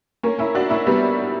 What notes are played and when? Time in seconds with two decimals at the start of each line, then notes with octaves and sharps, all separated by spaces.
0.23 A#3 C#4
0.39 C#4 E4
0.55 D4 F#4
0.70 C#4 E4
0.86 G3 B3